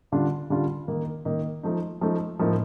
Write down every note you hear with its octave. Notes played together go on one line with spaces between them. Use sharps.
D3 G3 D4 F4
D3 G3 D4 F4
D#3 A#3 D#4
D#3 A#3 D#4
F3 A3 D#4
F3 A3 D#4
A2 F3 A#3 D#4